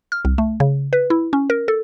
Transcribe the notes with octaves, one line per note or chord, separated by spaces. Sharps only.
F6
C2
A3
C#3
B4
E4
C#4
A#4
A4